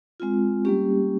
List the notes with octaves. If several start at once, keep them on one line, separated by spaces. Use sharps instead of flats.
G#3 C4 F4
G3 A#3 C#4 G4